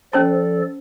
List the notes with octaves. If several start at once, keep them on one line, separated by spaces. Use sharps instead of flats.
F3 C#4 A4 C5 D5 A5